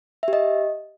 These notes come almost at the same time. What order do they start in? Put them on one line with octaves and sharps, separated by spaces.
E5 G4 D#5